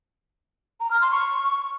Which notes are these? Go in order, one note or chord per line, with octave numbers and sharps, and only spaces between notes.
A#5
F6
C6
C#6